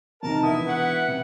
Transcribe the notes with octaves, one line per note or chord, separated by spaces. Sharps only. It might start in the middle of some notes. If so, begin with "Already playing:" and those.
F2 C3 D#3 A#4 A5
E1 B3 E4 D#6
B4 F#5
C3